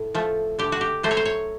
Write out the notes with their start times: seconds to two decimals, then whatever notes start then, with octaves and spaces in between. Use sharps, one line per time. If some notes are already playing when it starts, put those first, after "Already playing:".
Already playing: A2
0.15 F3 A3
0.59 D3 G4
0.72 F#4
0.81 G4
1.03 F#3 A3 C5
1.11 C#5
1.17 C5
1.25 C#5